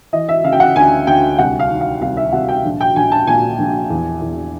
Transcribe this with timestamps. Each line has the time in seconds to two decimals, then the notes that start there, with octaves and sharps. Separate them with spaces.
0.13 E3 D#5
0.28 E5
0.44 C#3 F5
0.52 G5
0.60 F#5
0.76 D2 G#5
1.07 D2 G5
1.38 C2 F#5
1.59 F5
1.70 D#3
1.81 F5
2.01 C2 F5
2.17 E5
2.33 C2 F#5
2.48 G5
2.65 A#1
2.81 G5
2.96 A#1 G#5
3.12 A5
3.27 A#2 G#5
3.59 A#1
3.90 E2
4.22 E2